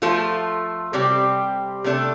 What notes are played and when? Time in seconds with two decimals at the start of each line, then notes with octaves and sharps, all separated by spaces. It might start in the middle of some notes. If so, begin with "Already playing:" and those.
0.02 F3 A3 F4 A4
0.93 C3 G3 C4 G4
1.84 C3 A3 D4 A4